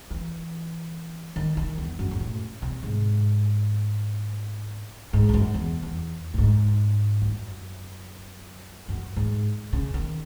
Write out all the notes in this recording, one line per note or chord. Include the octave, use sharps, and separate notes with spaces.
E3
D#3
D#3
E2
F#2
G#2
A2
C3
G#2
G#2
E2
F#2
E2
E2
A2
G#2
F#2
F#2
G#2
C#3
D#3